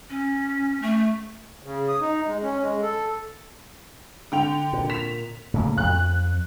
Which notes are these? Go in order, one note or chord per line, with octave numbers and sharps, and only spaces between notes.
C#4
A3
C#3
D#6
D#4
G#3
C#4
G#3
A4
D3 G5 F7
A#2
B6 E7 F7
A2 C#3 A#3
F2 F#6